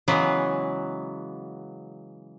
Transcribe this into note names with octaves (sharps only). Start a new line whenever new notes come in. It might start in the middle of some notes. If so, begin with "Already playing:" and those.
C#3 E3 F#3 G#3 B3